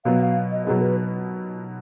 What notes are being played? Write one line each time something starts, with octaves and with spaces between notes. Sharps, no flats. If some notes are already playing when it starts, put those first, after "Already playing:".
B2 F#3 B3 F5
F5
D#5
B2 F#3 B3 G#4
B4